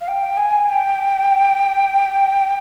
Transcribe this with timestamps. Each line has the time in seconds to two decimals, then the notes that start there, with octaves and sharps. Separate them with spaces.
0.01 F5
0.08 G5
0.37 G#5
0.69 G5